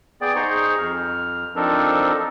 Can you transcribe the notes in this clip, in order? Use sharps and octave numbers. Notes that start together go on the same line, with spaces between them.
B3 G#4 D5 G5
D#4 G#4 C5 A#5 C6 C#6
F2 F6
F3 C4 D4 D#4 A4 A#4